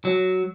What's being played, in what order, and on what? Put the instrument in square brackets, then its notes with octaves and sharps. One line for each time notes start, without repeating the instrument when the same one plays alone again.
[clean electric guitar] F#3